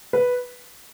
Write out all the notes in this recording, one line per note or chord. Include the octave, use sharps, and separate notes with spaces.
B4